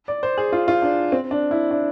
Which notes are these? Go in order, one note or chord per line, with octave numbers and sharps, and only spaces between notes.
D5
C5
G#4
F4
F4
D4
C4
D4
E4
D4